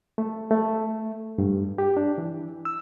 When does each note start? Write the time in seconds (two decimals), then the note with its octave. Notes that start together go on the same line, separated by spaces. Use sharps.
0.18 A3
0.51 A3
1.38 G2
1.78 G4
1.97 D4
2.18 E3
2.65 E6